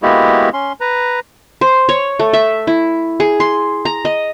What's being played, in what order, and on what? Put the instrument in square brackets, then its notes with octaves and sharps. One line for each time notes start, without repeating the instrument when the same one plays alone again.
[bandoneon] G#3 A#3 B3 E4 F#4 G4
C#4 C6
B4 A#5
[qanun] C5
C#5
A3
E5
E4
G#4
C6
A#5
D#5